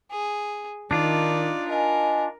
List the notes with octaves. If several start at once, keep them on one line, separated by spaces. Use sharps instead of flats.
G#4
D#3 D4 D#4 F4 D5
A#4 D#5 G#5